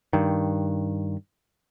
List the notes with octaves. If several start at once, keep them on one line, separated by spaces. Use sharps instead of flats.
G2 D#3